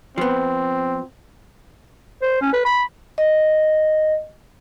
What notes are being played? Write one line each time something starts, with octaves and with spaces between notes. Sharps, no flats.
F3 B3 C4
C5
C#4
B4
B5
D#5